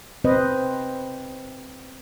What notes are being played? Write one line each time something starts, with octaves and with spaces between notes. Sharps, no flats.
C4 B4 C5 D#5